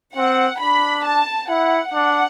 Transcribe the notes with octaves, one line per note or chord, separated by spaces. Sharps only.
C4 F#5
D4 B5
A5
E4 F#5
D4 F#5